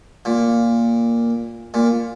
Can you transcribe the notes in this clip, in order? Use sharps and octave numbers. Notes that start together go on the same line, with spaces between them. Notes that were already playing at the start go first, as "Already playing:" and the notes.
A#2
A#2